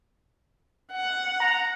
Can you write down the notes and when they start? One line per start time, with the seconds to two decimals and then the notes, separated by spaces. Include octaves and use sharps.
0.92 F#5
1.41 A#5